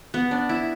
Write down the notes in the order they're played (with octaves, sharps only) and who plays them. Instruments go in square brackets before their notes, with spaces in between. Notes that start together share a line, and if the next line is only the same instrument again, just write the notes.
[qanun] B3
D4
E4